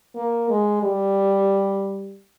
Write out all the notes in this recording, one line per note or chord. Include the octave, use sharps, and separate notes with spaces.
A#3
G#3
G3